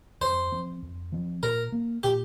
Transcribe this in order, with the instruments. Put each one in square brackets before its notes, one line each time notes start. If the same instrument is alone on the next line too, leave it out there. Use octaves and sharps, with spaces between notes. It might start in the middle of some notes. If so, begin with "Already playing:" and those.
[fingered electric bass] F2 [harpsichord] C5
[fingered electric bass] F3 C4
F2
F3 C4
[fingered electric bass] A#2 [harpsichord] A#4
[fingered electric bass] A#3
[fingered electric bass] A#2 [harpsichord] G4